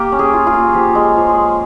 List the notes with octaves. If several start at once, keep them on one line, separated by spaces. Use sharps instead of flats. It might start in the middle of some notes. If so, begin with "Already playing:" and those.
Already playing: A#3 G4
C#4
G#4
F4
F4
A#3
F3 G4
G#3
F3
G#4
G#3